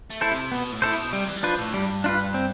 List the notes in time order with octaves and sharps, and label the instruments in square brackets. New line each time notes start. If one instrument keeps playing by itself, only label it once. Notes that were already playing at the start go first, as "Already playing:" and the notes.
[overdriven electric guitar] A3
[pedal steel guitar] E4 A4 C5
[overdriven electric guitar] C3
[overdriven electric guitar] B2 [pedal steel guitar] B3
[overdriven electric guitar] A2
[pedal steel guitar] E4 A4 C5
[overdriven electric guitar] B2
[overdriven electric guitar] C3 [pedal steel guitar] G3
[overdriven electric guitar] E3
G3
[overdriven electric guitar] F3 [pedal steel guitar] D4 F4 B4
[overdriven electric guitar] A2
[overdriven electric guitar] G2 [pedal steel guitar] G3
[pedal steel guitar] D4 F4 B4
C4